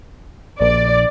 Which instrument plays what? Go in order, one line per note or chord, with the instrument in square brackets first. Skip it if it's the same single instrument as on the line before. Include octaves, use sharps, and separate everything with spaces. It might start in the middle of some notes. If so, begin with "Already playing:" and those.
[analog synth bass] A#1 [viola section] D5